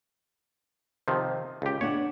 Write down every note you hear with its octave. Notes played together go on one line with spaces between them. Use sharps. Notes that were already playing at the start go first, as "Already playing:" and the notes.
C3 D#3 F3
C#2 G4
B3 D4 C#5 F#5